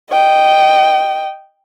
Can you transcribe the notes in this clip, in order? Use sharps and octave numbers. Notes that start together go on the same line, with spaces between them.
D#5 G5